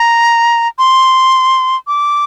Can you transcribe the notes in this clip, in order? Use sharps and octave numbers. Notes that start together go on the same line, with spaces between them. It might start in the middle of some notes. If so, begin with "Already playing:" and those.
Already playing: A#5
C6
D6